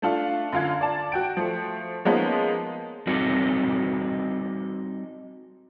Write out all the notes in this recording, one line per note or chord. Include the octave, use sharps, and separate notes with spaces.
A3 D4 F4
F#2 D3 F4 F5 G#6
D5 A5
F#4 G5 D7
F3 A3
F3 G#3 A#3 B3 C#4 D#4
G3 C4 D#4 F#4 A4